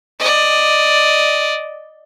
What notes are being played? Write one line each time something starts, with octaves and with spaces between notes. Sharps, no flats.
D5 D#5